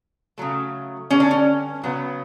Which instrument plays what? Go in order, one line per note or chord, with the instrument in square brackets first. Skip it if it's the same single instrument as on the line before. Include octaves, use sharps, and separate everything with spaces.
[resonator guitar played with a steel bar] C#3 F#3 A3
D3 G3 B3 C#4
D4
C#4
C#3 F#3 B3